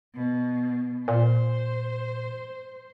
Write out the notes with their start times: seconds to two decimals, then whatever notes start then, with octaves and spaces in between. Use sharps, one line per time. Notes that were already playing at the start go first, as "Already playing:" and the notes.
0.14 B2
1.08 A#2 C5